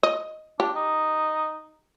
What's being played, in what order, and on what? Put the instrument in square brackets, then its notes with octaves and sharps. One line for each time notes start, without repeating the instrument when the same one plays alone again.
[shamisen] D#5
[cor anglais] D4 [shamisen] G4
[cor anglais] D#4